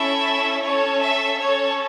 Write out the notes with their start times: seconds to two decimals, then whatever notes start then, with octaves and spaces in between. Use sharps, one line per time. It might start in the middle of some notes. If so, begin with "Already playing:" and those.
Already playing: C#4 E4 A4 E5
0.63 C#4 A4 C#5
1.00 E5
1.38 C#4 A4 C#5